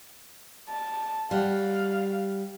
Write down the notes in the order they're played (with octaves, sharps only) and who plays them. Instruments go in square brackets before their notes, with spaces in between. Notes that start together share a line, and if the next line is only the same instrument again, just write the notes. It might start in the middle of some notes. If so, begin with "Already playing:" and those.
[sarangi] A5
[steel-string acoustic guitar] G3 F#5 [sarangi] F5